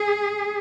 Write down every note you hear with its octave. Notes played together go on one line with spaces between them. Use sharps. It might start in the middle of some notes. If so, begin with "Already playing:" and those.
Already playing: G#4